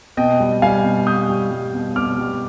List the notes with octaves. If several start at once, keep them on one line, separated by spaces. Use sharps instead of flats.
B2 D#5 G5
G3
G3 F5 G#5
B2
B2 D#6 G6
G3
G3
B2
B2 D6 F6
G3